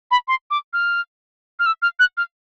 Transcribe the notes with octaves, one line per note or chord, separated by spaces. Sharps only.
B5
C6
D6
F6
F6
E6
F6
F#6
F6